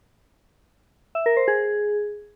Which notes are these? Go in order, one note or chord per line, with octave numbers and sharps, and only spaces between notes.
E5
A#4
C5
G#4